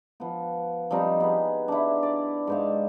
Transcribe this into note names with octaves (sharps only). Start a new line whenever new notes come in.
F3 B3
F3 G3 C4 D#4
B3 G#4
D4 E4
D5
G#2 C5 F5